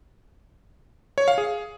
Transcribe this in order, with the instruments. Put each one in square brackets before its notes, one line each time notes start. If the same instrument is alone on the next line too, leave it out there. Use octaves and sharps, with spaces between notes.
[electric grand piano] C#5
F5
G#4